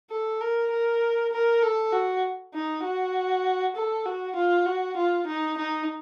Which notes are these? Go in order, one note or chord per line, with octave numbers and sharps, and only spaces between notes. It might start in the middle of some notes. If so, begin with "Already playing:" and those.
A4
A#4
A#4
A#4
A4
F#4
D#4
F#4
A4
F#4
F4
F#4
F4
D#4
D#4